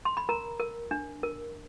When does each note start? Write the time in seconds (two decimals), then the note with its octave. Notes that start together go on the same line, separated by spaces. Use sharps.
0.05 C6
0.17 B5
0.29 A#4 A#5
0.60 A#4
0.91 D4
1.23 A#4